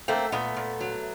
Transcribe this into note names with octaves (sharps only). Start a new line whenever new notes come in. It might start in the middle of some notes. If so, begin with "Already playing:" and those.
A3 A#3 C4
A#2 A3 B3
A#2
F#3